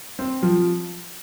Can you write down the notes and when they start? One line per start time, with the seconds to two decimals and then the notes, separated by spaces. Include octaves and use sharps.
0.19 C4
0.43 F3